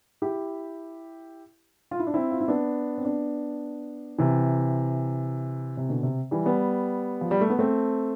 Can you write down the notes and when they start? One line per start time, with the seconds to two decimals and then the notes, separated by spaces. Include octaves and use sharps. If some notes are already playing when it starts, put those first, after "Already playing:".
0.22 E4 G4
1.91 F4
2.00 E4
2.07 D4
2.14 C4 E4
2.31 F4
2.40 E4
2.48 B3 D4
2.98 C4
3.05 B3 D4
4.18 C3 E3
5.77 C3
5.89 B2 D3
6.03 C3
6.31 E3 G3
6.46 G3 B3
7.21 F3
7.31 G3
7.41 A3
7.50 B3
7.59 A3 C4